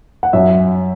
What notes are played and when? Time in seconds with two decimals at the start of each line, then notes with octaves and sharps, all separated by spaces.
0.23 F#5
0.33 F#2 E5